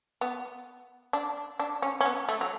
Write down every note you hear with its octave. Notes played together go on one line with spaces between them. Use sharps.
B3
D4
D4
C#4
C#4
B3
A3
F#3